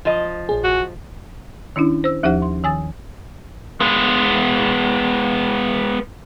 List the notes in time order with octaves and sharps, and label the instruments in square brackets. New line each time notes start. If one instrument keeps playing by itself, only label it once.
[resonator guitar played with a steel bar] F3 D#5
[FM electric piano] A#1 G#4
[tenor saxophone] F#4
[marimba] D#3 C#4 D4 E4
C5 E6
D#2 F3 D#4 G4 C5 F#5
C6
D#3 G#5 D#6 A6
[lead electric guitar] G#3 B3